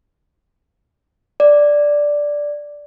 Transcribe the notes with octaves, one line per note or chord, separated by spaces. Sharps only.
D5